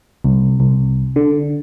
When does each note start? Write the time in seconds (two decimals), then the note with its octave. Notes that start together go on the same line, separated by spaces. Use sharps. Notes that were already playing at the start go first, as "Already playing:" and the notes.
0.24 C2
0.60 C2
1.16 D3